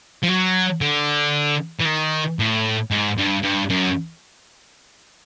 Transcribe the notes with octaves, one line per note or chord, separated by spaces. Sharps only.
F3
F#3
D3
E3
D#3
A2
G#2
G2
G2
F#2